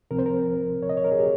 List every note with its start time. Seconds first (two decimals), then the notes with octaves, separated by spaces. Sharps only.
0.11 C#2 C3 F3 C4 A#4
0.19 C5
0.26 A#4
0.83 C#5
0.89 D#5
0.97 C#5
1.04 A#4
1.12 G#4
1.19 G4